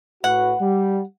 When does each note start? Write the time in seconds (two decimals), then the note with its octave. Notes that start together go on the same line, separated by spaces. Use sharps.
0.24 A2 F#4 B4 F#5
0.60 G3